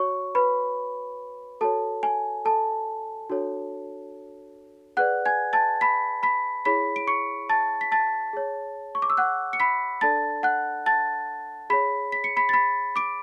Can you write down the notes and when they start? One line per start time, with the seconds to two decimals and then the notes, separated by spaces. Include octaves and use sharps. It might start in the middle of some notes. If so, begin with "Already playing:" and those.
Already playing: F#4 C#5 C#6
0.35 B4 B5
1.61 F#4 A4 C#5 A5
2.03 G#5
2.45 A4 A5
3.30 D4 F#4 A4 C#5
4.97 G#4 B4 D5 F#5 F#6
5.26 G#5 G#6
5.53 A5 A6
5.81 B5 B6
6.23 B5 B6
6.65 E4 G#4 C#5 B5 B6
6.96 D7
7.07 C#6 C#7
7.49 A5 A6
7.81 B6
7.92 A5 A6
8.33 G#4 C#5
8.95 C#6
9.02 D6
9.10 E6
9.17 F#5 F#6
9.53 C#7
9.60 B5 B6
10.01 D4 A4 D5 A5 A6
10.43 F#5 F#6
10.86 A5 A6
11.70 G#4 C#5 B5 B6
12.12 B6
12.24 C#7
12.37 B5 B6
12.49 A6
12.53 B5 B6
12.96 D6 D7